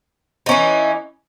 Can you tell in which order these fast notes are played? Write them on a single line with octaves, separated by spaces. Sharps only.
D#4 C#4 E3